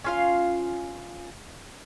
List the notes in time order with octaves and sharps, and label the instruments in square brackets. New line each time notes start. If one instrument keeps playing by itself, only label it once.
[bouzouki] C#4 F4 F5